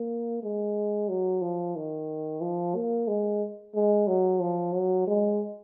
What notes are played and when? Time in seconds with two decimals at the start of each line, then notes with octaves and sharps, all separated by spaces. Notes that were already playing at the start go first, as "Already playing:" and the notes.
Already playing: A#3
0.44 G#3
1.09 F#3
1.42 F3
1.76 D#3
2.41 F3
2.75 A#3
3.08 G#3
3.75 G#3
4.07 F#3
4.41 F3
4.74 F#3
5.07 G#3